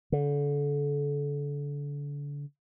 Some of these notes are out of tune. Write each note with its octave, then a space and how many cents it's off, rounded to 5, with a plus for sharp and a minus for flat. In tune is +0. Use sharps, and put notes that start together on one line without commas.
D3 -30